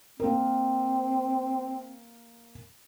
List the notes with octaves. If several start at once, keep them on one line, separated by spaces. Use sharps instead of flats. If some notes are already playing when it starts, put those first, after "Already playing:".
A#3 C4 A#4